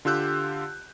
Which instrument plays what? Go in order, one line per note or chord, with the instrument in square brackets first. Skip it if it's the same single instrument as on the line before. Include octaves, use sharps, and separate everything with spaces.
[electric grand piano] D3 F4 G4 E6 F#6 G6